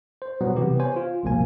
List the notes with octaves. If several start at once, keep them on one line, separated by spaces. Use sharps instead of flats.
C5
B2 F#3 G3 B3
C3 E3 B3 G4
C5 C#5 G#5
F4
G1 C2 B2 F3 A#3 G#5